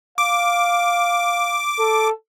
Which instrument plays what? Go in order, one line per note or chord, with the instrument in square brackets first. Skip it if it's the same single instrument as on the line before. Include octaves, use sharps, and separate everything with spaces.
[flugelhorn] F5 [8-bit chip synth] D6
[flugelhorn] A4